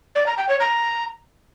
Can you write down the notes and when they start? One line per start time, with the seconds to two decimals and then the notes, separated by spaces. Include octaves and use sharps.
0.15 D5
0.27 A#5
0.38 G5
0.49 C#5
0.60 A#5